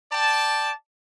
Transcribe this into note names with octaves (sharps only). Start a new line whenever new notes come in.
D5 G5 A5